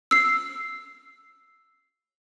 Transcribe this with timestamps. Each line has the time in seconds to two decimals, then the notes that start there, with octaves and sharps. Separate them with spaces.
0.11 E6 C7